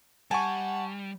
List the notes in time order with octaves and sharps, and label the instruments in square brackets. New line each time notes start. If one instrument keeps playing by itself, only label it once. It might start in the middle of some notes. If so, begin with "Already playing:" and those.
[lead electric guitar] G3 [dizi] F#5 [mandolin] G#5 [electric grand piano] A5 C#6